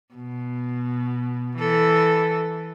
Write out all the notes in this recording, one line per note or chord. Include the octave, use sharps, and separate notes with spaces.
B2
E3 A4